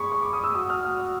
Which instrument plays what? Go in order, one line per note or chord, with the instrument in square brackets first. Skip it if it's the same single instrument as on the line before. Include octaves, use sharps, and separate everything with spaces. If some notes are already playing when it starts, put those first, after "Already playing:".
Already playing: [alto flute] G#4 [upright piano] B5 C#6
[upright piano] C#6
D6
D#6
E6
[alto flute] F#4 [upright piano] D#6
[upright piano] F6
F6